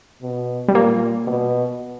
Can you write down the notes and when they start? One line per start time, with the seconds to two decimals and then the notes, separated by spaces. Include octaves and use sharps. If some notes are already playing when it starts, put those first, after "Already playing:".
0.22 B2
0.68 G3
0.75 A#2 A#3
1.27 B2